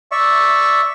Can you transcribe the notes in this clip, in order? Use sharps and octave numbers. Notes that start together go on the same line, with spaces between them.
D5 E5 C#6